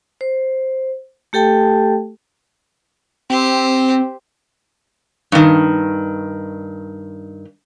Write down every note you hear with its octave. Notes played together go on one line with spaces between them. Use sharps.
C5
A3 G4 A4 G5 A5
C4 G4 C5
G2 D#3